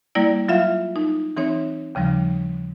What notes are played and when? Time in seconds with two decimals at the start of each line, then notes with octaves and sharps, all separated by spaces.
0.15 G3 A#3 E4 D5
0.48 F#3 F4 E5 F5
0.96 D#4
1.37 E3 C4 D#4 C#5
1.95 D#2 C#3 F3 G3